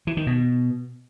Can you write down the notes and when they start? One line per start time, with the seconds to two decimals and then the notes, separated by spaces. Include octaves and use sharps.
0.07 E3
0.17 D#3
0.27 B2